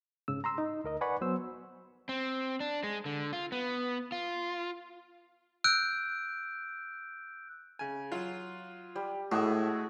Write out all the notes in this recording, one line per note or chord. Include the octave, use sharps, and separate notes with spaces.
G#2 C#3 E6
A#5 C6 E6
D#4
D2 A#4 D#5
B4 D5 F#5 G#5 B5 C#6
F#3 B3 C5 E6
C4
D4
G#3
D3
F4
B3
F4
E6 F#6 G6 D7
C#3 G#5
F#3 F4
G3
A2 G#3 A3 F#4 G#4 E5